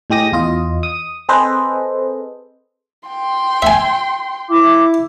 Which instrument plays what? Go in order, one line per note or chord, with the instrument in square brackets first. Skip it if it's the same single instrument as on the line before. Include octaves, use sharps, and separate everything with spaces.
[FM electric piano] A2 G#3 G4 D#6 A#6
E2 F4 D#5
D#6
C4 G#4 A4 B4 C5 D#5
[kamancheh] G5 C6
[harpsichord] E5 G#5
[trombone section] E4 [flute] D6